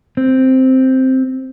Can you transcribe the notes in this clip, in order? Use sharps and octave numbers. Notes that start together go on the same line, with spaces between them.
C4